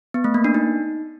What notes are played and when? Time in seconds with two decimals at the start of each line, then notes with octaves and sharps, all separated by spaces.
0.14 B3
0.24 A3
0.34 A#3
0.44 D4
0.54 D#4